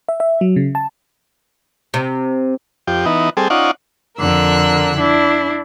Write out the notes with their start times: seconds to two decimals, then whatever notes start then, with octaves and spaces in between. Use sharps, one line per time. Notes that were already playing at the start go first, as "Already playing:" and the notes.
0.09 E5
0.20 E5
0.41 F#3
0.56 C#3
0.75 A5
1.94 C3
2.87 F2 G4
3.06 E3 B3 D#4
3.37 G3 C4 G#4 A4
3.50 C#4 D#4 F4 D5 F#5
4.19 F2 D3 A#4 E6 F#6
4.97 D4 E4